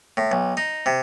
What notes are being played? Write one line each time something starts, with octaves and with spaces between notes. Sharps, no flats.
A2
B1
D#4
C3